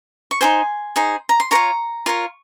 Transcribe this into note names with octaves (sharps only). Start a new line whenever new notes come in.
C#6
D#4 G#4 C5 G#5 C6
D#4 G#4 C5
A#5
C6
F4 A#4 C#5 A#5 C#6
F4 A#4 C#5